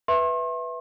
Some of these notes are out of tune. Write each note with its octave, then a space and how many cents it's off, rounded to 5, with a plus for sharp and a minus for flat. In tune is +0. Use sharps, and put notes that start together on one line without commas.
B4 +0 E5 +0 C6 +40